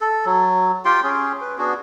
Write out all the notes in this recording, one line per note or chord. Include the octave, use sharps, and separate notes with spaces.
A4
F#3
F4 G4 G5 C6
C#4 G#4
B4
B3 D4 F#4 G#4